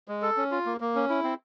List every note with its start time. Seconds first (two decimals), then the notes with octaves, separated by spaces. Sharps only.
0.08 G#3
0.22 A4
0.37 C#4
0.52 F4
0.66 A#3
0.80 A#3
0.95 C#4
1.09 E4
1.24 C4